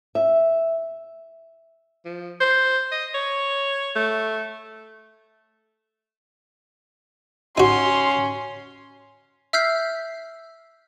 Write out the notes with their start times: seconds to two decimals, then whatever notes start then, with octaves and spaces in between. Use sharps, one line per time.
0.15 E5
2.05 F3
2.40 C5
2.92 D#5
3.15 C#5
3.96 A3
7.58 C#4 D#4 F#4 C6
9.53 E5 E6 F6 G6 B6 C7